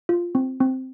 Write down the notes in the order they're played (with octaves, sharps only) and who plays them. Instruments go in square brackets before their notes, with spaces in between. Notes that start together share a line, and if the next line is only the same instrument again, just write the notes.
[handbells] F4
C4
C4